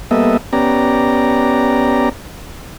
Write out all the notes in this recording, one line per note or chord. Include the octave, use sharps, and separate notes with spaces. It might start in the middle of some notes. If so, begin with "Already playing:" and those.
G3 A#3 B3 A4 D#5 E5
B3 C#4 G4 D5 A#5